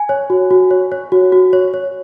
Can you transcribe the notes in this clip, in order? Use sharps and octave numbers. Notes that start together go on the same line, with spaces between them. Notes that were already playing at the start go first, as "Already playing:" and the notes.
Already playing: G#5
C#5
F#4
F#4
C#5
C#5
F#4
F#4
C#5
C#5